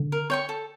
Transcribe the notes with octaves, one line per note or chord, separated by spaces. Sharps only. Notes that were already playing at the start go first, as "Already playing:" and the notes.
Already playing: D3
A#4
C#5 G5 C#6
A4